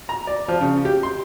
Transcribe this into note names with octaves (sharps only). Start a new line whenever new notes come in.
A#5
D5
F3
C#3
G4
C6